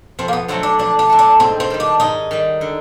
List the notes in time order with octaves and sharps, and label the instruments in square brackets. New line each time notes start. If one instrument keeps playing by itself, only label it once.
[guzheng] F2 [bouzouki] C4
[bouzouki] A#3
B3
[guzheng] D3 F#3 A3 [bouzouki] C4
[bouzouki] D4
[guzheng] F2 [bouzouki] D4
[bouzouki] D4
[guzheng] D3 F#3 A3
[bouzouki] D4
[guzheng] G#2 [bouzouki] C4
[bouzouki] C4
[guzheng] D#3 G3
[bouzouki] D4
[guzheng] G#2 [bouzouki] D#4
[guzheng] D#3 G3
D3